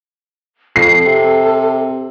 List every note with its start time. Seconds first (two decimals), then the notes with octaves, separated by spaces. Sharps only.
0.76 F2 A4 C7
1.06 C3